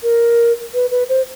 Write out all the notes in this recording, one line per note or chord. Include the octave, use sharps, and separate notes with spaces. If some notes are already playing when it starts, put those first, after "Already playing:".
A#4
B4
B4
C5